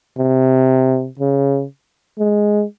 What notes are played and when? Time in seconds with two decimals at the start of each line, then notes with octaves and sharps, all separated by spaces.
0.18 C3
1.19 C#3
2.19 G#3